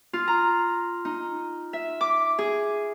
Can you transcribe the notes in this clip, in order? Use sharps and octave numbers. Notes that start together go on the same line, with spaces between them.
F4
A#5
D#4
E5
D6
G#4